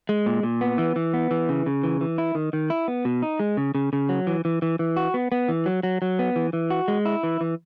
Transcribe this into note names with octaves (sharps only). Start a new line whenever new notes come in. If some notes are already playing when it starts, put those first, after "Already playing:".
G#3
A#2
A#2
B3
E3
E3
B3
E3
C#3
C#3
E3
E3
E4
D#3
D#3
E4
B3
B2
D#4
G#3
C#3
C#3
C#3
F#3
E3
E3
E3
E3
F#4
B3
B3
E3
F#3
F#3
F#3
B3
E3
E3
F#4
G#3
E4
E3
E3